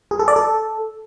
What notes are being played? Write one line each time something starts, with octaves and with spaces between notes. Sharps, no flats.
G#4
A4
D5
A4